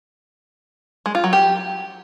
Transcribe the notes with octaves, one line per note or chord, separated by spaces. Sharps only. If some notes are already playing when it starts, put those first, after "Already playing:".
G#3
F4
F#3
G4